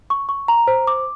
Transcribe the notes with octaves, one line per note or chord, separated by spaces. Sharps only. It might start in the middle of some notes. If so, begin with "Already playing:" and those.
C#6
C#6
A#5
C5
D6